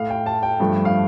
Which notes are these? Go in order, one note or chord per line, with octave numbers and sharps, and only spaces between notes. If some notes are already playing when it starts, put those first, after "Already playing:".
Already playing: A2 A3 F5
G5
A5
G5
G2 F3 A3
F5